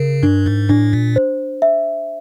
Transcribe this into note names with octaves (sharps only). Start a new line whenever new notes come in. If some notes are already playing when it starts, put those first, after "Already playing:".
Already playing: C#3 A#4
G2 D4
G#2
A2 D4
A#2
C5
E5